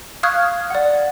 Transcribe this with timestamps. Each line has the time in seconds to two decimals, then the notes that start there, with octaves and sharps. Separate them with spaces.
0.23 F5 C#6 D#6 F6 F#6 G#6
0.70 D5 F#5